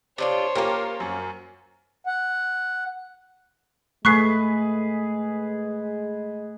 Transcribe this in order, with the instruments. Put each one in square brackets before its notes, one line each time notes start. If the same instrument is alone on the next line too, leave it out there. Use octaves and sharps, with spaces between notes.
[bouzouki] C3 D4 F4 [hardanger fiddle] C5 C#5
[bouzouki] A#3 C#4 [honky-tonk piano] F4 G4 A#4
[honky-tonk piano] F#2
[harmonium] F#5
[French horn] G#3 [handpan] A3 [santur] G#4 B4 [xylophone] C#6 F#6 C7